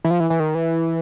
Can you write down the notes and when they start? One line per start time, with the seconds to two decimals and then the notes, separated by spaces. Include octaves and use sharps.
0.05 E3
0.11 F3
0.20 E3
0.30 E3
0.40 D#3
0.55 E3